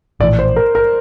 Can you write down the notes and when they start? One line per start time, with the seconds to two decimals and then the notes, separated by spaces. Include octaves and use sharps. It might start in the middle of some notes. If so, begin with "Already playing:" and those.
0.20 A#1 A2 E3 D5
0.39 C5
0.56 A#4
0.75 A#4